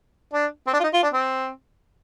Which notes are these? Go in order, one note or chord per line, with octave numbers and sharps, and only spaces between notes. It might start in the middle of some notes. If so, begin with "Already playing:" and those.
D4
C4
D4
F4
D#4
F4
D4
C4